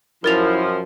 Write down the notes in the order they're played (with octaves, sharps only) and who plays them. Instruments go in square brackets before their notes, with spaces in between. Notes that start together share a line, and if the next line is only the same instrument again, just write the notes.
[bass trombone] F#2 [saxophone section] F3 [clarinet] E4 [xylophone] A#4 A6 F7